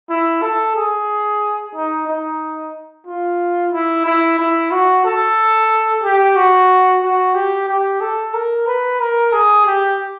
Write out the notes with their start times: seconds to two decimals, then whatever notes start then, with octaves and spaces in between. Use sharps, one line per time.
0.09 E4
0.42 A4
0.76 G#4
1.75 D#4
2.08 D#4
3.07 F4
3.72 E4
4.06 E4
4.39 E4
4.71 F#4
5.05 A4
6.04 G4
6.36 F#4
7.03 F#4
7.34 G4
7.69 G4
8.00 A4
8.33 A#4
8.67 B4
9.00 A#4
9.32 G#4
9.66 G4